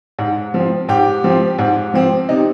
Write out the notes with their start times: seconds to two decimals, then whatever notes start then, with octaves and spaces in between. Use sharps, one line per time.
0.19 G#2
0.54 F3 C4
0.89 G#2 G4
1.24 F3 C4
1.59 G#2
1.94 F3 C4
2.29 C3 D#4